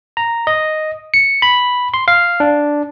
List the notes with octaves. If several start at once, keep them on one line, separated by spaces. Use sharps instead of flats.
A#5
D#5
C#7
B5
C6
F5
D4